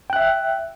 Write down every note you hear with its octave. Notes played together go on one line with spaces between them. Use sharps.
E5 G5 F#6